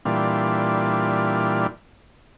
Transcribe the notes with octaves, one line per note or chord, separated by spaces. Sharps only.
A#2 E3 G3 D4 F4